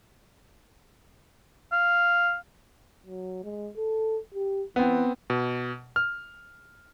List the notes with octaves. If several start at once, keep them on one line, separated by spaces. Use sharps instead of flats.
F5
F#3
G#3
A4
G4
E3 B3 C4
B2
F6